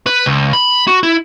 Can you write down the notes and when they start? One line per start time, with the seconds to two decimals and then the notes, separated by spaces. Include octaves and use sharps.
0.06 B4
0.26 C#2
0.53 B5
0.87 F#4
1.03 E4